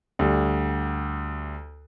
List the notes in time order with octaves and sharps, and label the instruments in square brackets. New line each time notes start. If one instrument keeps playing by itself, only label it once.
[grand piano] D2 G3